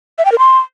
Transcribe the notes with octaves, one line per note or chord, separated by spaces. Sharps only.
E5
G5
A#4
C6